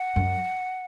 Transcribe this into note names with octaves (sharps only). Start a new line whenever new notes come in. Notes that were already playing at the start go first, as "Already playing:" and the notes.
Already playing: F#5
F#2